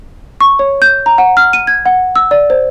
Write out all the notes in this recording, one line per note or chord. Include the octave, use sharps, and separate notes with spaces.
C#6
C#5
G6
A#5
F#5
F6
D#7
G#6
F#5
E6
D5
C5